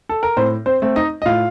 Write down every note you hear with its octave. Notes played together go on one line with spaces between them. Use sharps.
A4
A#4
A2 C4 C5
C4 C5
A3 C4
D#4 D#5
D#5
A2 F4 F5